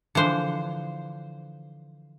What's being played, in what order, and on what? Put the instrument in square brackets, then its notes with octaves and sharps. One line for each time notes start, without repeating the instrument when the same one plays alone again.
[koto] D3 E3 F3 C5